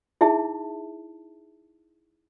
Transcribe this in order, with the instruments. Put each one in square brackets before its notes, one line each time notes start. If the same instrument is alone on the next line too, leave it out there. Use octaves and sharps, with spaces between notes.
[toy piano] D#4 E4 G#4 E5 A5